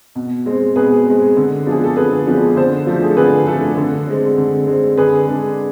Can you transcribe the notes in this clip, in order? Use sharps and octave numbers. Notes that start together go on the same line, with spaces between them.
B2
G#3 C4
B2 G#4 B4
G#3 C4
D3
F3 G#3 B3 D4 G#4
A4
D3 G#4 B4
F3 G#3 B3 D4
D3 A4 C5
F3 A3 D4
G#4
A4
D3 G#4 B4
F3 A3 D4 A4
D3 A4
G#3 C4
D3
G#3 C4
D3 G#4 B4
G#3 D4